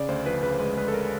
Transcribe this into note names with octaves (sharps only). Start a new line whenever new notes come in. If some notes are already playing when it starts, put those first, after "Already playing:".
Already playing: C#3 D5
D2 C5
F3 B4
C#3 B4
C5
G#3 B4
G#3 B4
A4
A#4